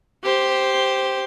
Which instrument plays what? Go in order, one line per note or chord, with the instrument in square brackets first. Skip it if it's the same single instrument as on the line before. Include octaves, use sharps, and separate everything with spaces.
[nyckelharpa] G4 C5